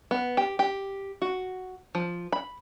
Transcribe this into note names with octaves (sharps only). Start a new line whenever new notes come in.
B3
G4
G4
F#4
F3
B5